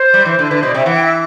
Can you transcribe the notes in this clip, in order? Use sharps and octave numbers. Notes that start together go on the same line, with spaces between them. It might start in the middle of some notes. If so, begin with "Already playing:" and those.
Already playing: C5
G3
E3
D3
D3 B4
B2 C5
D5
C3 E5
E3 F#5
G5
E5